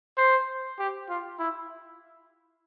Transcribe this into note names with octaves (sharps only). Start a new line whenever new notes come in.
C5
G4
F4
E4